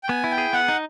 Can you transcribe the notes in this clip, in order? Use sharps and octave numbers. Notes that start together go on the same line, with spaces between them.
G5
B3 G#5
E4
G5
G#4
B3 F#5
D#4